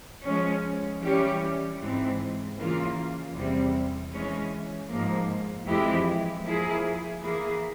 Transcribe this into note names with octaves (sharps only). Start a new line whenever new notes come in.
F3 G#3 C#4
E3 G3 C#4 G4
G#2 E3 G#3 C4
C#3 E3 A#3 F4
E2 C3 G3 C4
E3 G#3 C#4
G#2 F3 A#3
F2 E3 G#3 E4 G4
F3 A#3 E4 G#4
E3 A#3 E4 G#4